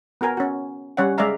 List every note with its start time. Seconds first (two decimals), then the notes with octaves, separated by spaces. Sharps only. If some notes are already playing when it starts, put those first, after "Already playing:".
0.21 B3 F#4 A#4 G#5
0.37 C#4 F#4
0.97 G3 C#4 C#5 F5 F#5
1.18 G#3 D5 E5 F5 A#5